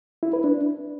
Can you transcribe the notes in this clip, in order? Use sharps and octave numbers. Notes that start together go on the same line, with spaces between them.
E4
B4
D4